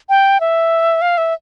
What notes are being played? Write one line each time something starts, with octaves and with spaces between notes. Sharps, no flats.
G5
E5
F5
E5